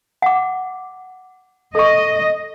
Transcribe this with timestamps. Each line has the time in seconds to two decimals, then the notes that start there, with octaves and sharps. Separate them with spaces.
0.22 F#5 D6
1.75 A4 D#5 C#6